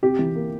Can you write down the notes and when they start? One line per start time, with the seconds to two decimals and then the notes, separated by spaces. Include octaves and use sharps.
0.03 C3 G4
0.19 E3
0.35 A#3